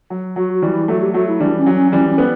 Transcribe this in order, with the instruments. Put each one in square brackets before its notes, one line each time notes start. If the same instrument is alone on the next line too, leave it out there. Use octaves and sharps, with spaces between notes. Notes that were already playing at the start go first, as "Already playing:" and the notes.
[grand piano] F#3
[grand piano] F#3 [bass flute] F#4
[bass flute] F#4
[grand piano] E3 G3
[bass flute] E4
[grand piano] F#3 A3 [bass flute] F#4
[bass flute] G4
[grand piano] F#3 A3 [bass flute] F#4
[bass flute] E4
[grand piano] E3 G3 [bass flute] D4
[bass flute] C#4
[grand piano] F#3
[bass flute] C#4
[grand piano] E3 G3 [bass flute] C#4
[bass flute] C#4
[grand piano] G3 B3